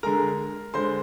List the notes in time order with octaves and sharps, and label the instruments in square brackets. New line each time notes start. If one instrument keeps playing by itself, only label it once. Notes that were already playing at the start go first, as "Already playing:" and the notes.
[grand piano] D3 G#3 A#4 A#5
D3 G#3 C5 C6